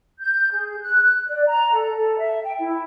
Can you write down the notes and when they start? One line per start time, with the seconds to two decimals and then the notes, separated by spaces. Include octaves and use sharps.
0.19 G6
0.52 G#4
0.81 F#6
1.27 D5
1.48 A#5
1.73 A4
1.95 A4
2.18 E5
2.43 G5
2.59 E4